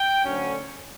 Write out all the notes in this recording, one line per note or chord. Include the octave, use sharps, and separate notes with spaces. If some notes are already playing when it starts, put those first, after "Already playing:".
Already playing: G5
D2 D3 F#3 C#4